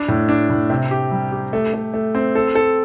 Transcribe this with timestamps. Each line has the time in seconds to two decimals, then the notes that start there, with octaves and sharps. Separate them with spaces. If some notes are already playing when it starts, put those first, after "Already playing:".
Already playing: D4
0.08 A2
0.29 D4
0.50 A2
0.70 C3
0.91 G4
1.11 G3
1.32 G4
1.53 A3
1.74 A3
1.94 A3
2.15 C4
2.35 A4
2.55 A4